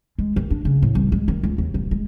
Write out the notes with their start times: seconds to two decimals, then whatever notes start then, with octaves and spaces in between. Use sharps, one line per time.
0.19 G#3
0.36 D#3
0.50 D4
0.65 C#3
0.82 A2
0.95 C2
1.12 G#3
1.28 D#3
1.43 C#2
1.58 D#2
1.74 D#1
1.91 G#3